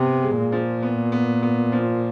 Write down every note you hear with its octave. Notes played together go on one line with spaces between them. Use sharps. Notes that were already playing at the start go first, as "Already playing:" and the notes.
Already playing: C3 B3
G#3
A#2
F3
B3
B3
B3
F3